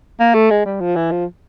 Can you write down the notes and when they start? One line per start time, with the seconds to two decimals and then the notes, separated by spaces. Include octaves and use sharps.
0.20 A#3
0.34 A3
0.51 G#3
0.66 G3
0.81 F3
0.96 E3
1.12 F3